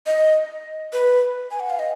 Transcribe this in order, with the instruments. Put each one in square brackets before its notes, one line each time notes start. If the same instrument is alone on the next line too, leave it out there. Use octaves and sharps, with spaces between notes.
[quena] D#5
B4
G#5
F#5
F5
D#5